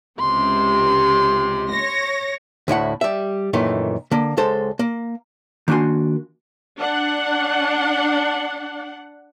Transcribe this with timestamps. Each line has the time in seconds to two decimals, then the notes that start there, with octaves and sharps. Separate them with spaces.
0.19 C#2 C3 C6
1.73 C#5 A#6
2.68 D2 A2 E4 F#5
3.01 G3 E5
3.53 F#2 A#2 D#3 E3 A3
4.11 D3 A#3
4.37 C#2 G#3 A4 C5
4.79 A#3
5.68 D#3 A#3 D4 F#4 G#5 C6
6.77 D4 F#5